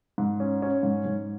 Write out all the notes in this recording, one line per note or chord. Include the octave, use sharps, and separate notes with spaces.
G#2
C#4
C#4
G#2
G#2